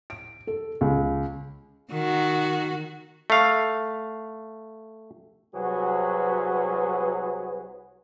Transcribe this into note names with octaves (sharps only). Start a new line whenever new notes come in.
D7
A4
C#2
D#3 F#4
A3 F5
C2 F#3 F#4 G#4 B4